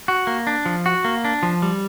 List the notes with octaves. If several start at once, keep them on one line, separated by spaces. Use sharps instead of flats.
F#4
A#3
D4
F3
F#4
A#3
D4
F3
G3